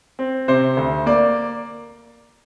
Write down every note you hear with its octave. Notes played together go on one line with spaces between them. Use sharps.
C4
C3 C5
D2
A#3 D5